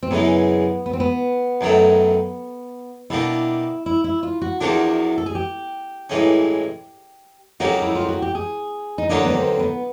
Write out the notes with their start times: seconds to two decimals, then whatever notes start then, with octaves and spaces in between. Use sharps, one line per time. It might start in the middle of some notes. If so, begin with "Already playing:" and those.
0.03 C4
0.11 F#2 C#3 E3 G#3 B3
0.86 B3
0.93 C4
1.00 B3
1.61 F#2 D#3 F#3 A3
3.10 B2 G3 A#3 D4 E4
3.86 E4
4.04 E4
4.23 F4
4.42 F#4
4.61 E2 C3 F3 A#3 D4 F#4
5.18 A4
5.26 G#4
5.35 G4
6.10 A1 G2 E3 G#3 C#4
7.60 F2 C#3 F#3 A#3 D#4 G4
7.82 E4
7.95 F4
8.09 F#4
8.22 G4
8.35 G#4
8.98 D#4
9.09 D#2 D3 F#3 A#3 D4 D#4
9.25 B3
9.34 C4
9.59 B3